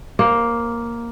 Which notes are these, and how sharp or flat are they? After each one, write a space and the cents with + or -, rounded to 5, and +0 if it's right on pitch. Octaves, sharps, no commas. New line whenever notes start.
A#3 +5 C5 +35